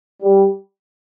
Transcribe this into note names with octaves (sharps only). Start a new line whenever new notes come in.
G3